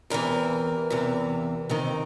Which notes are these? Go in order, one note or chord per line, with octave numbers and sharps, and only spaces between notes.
E2 C3 E3 A#4
E2 C3 E3
F2 C3 D#3